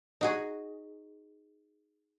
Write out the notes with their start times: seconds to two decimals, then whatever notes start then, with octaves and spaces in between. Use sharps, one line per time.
0.21 D#4 F#4 G#4